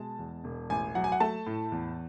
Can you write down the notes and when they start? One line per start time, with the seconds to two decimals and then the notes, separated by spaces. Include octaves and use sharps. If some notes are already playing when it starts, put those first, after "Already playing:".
Already playing: B2 G#3 A5
0.19 E2
0.44 E1
0.70 A1 G#5
0.95 F#3 F#5
1.04 G#5
1.12 F#5
1.20 A3 A5
1.46 A2
1.72 E2